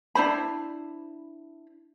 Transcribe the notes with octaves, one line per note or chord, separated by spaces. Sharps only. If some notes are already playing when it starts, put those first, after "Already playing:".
D4 E4 C5 B5